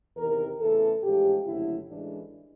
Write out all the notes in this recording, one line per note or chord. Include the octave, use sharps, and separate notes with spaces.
E2 C3 D#3 A#4
E2 C#3 E3 A3 A4
A1 G#2 F3 G#3 G4
F#1 F2 D3 F#3 A3 E4
A1 A2 E3 G#3 D4